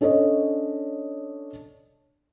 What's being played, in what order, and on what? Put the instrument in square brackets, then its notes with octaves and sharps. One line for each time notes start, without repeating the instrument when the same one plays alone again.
[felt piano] C#4 D4 A4 C#5 D#5